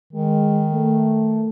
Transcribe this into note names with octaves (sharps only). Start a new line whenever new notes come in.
D#3 G#3
A3